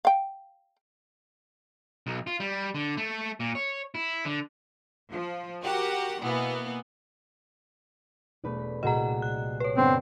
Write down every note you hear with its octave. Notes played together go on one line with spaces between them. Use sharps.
F5 G5
B1
F4
G3
D3
A3
A#2
C#5
E4
D3
F3
F#4 G4 A#4 F#5
B2 E3 A#3 B3
E1 A3 B4 D5
B6
C2 A#2 F#4 G#4 D#5 F#5 A#5 D7
F#6
B4 C#5
G2 D3 B3 C4